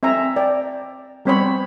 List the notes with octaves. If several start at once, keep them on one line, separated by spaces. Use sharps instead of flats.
C4 E5 G#5 A#5
D5 G5
G3 B3 C4 C5 C#5 B5